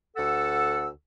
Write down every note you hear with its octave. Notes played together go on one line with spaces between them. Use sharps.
D2 A4 F#5 E6